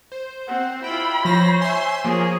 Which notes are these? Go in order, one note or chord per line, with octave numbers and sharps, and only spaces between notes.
C5
C4 F#5
E4 F4 G5 B5
F3 C5 C#5 A#6
E5 G#5 C6
F3 A#3 G#4 C#5